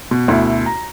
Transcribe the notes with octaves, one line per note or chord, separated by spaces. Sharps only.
B2
D2 B2 E4
A#5